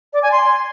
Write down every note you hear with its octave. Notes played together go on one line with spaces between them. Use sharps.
D5
G#5
C6